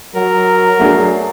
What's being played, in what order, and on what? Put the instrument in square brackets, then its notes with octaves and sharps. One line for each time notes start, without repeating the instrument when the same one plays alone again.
[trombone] F#3 [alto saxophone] A#4
[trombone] F#3 [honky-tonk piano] A3 D4 G#4